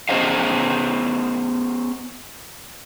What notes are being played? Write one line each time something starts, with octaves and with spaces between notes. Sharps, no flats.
B3 C#4 G#4 C5 D#5 F5